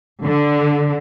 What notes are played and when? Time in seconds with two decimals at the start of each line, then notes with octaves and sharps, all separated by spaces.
0.23 D3